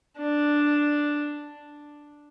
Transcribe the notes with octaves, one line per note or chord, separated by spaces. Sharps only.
D4